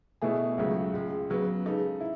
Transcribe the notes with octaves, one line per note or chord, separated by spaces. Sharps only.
B2 A3 E4 G#4
C#2 C#3 F#3 A3
C#2 C#3 G#3
C#3 F#3 B3
C#3 G#3 D#4 A4
E4